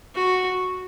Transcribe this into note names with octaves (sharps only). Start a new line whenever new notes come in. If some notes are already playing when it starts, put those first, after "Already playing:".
F#4